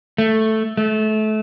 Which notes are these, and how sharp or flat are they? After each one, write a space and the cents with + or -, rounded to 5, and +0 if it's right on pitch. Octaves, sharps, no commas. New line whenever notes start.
A3 +0
A3 -25